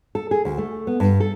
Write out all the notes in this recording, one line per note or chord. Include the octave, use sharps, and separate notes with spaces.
A4
G#4
D2
A3
B3
G2
A4